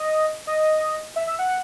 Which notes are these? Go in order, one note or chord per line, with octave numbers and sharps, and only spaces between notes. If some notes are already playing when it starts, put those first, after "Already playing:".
Already playing: D#5
D#5
E5
E5
F#5